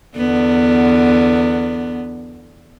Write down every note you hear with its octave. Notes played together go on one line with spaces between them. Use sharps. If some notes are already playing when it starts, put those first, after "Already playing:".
E2 D3 B3